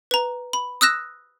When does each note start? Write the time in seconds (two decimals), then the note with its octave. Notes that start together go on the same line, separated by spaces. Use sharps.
0.11 B4 A#5
0.53 B5
0.81 D#6 E6 F#6 A#6 E7